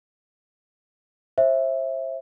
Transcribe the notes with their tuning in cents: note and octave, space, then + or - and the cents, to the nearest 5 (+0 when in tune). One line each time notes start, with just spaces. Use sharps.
C5 +30 E5 +0